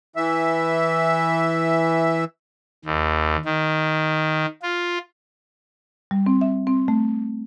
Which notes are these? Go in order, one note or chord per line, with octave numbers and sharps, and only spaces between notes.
E3 E5
D#2
D#3
F4
G3
C4
E5
C4
A3